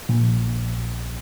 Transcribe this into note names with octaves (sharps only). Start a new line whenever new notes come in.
A#1